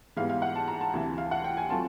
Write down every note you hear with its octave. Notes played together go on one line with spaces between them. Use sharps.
G#2 E3 G3 B3 F5
F5
F#5
A5
A#5
A5
D2 C3 E3
F5
F#5
G5
G#5
F#3 A3 C4 F4 A5